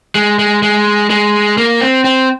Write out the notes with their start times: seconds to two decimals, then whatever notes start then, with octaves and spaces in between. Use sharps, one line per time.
0.15 G#3
0.39 G#3
0.63 G#3
1.10 G#3
1.58 A#3
1.81 C4
2.04 C4